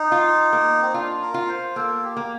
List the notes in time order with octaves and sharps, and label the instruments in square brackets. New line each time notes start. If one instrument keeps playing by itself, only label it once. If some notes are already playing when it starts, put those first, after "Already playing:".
Already playing: [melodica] D#4
[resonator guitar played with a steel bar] F4
A#3
[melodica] C4
[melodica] D4 [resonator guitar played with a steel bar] F4
[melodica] A#4
[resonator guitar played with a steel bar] F4
[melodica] C5
[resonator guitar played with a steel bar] A#3 [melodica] A4
[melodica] G4
[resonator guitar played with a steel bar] A#3